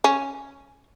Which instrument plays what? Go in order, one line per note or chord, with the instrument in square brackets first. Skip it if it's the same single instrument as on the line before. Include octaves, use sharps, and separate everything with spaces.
[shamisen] C#4